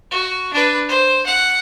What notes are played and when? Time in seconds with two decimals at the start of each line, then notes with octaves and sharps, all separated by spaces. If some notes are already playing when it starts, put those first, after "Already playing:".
0.11 F#4
0.53 D4 B4
0.89 C5
1.26 F#5